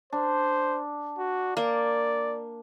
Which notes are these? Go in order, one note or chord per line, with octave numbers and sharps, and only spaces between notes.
D4 C5
F#4
A#3 D5